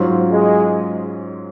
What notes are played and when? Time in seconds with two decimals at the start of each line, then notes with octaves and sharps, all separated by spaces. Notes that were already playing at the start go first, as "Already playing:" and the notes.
Already playing: G#2 F#3 C#4 F4 C5
0.31 G#3